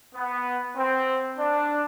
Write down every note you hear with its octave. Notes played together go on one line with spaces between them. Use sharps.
B3
C4
D4